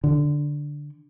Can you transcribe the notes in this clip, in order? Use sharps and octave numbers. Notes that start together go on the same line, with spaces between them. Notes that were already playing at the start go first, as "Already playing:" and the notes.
D3